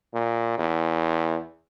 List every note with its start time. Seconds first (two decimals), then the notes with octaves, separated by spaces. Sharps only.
0.14 A#2
0.58 E2